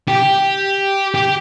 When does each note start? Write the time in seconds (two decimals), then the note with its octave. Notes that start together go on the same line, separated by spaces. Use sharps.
0.08 G4
1.15 G4